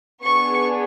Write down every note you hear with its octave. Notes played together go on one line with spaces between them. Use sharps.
B3 D4 G#4 C#6